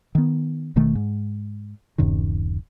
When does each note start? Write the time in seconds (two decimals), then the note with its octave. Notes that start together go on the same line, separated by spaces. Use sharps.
0.15 D#3 B3
0.76 E1 B2 D#3 A3
0.95 G#2
1.98 D1 F#2 C3 D#3